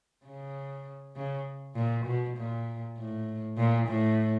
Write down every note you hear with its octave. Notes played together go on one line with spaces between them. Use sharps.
C#3
C#3
A#2
B2
A#2
A2
A#2
A2